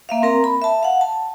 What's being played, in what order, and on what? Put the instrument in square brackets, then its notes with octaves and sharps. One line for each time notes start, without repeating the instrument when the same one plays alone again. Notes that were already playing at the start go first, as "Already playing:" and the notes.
[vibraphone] A#3 E5 F5
C4 A#4 A#5
B5
E5 A5
F5 F#5
A5